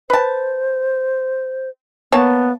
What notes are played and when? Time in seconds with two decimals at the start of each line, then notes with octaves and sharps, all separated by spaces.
0.10 B4 C5 A5
2.12 A#3 B3 C#5 A5